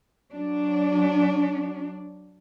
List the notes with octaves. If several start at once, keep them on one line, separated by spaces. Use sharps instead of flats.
F#3 D4